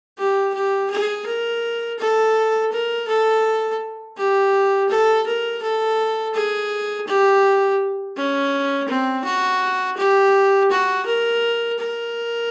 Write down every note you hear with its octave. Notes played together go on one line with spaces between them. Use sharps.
G4
G4
G#4
A#4
A4
A#4
A4
G4
A4
A#4
A4
G#4
G4
C#4
C4
F#4
G4
F#4
A#4
A#4